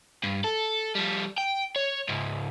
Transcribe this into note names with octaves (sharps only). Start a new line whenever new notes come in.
G2
A4
F3 G3
G5
C#5
C#2 G#2